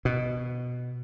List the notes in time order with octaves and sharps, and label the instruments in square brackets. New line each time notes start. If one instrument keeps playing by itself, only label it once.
[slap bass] B2